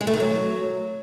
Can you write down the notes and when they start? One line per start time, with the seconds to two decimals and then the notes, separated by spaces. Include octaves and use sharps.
0.01 G#3
0.07 A3
0.13 D#3
0.20 F#3